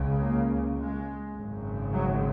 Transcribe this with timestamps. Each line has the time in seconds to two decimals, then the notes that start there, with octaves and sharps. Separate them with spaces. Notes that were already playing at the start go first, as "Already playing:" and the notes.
Already playing: C#2 C#3
0.21 A#3
0.79 G#3
1.35 G#1 F#2 C#3
1.93 F#3